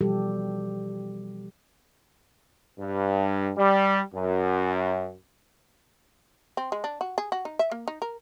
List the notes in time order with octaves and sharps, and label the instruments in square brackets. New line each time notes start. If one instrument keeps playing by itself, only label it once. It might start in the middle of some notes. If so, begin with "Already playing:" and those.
[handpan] B2 E3 F3 G3 G4 A4
[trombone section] G2
G3
F#2
[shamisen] C4
G#3
D4
F#4
G#4
F#4
D#4
E5
A#3
D#4
A#4